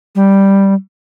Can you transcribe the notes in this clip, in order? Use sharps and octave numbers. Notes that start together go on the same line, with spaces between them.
G3